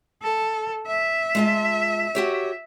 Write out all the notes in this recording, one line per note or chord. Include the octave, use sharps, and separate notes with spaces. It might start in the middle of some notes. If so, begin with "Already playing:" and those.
A4
E5
G#3 F4 A5
F#4 G4 C#5